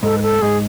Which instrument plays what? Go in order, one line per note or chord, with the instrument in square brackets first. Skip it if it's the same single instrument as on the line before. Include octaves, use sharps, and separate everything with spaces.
[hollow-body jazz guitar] G#2 [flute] A4
[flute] B4
A4
[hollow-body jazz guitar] G#2 [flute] G#4